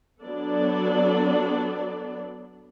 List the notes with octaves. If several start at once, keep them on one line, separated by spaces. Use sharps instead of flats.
F#3 B3 D4 A4 D5